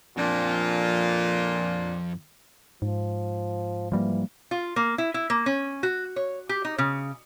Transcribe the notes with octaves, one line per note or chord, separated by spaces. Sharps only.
F2 A#2 D4 F4
G#2 F3
E3 F3 G3 A#3
F4
A#3
E4
E4
A#3
C#4
F#4
C#5
G4
D#4
C#3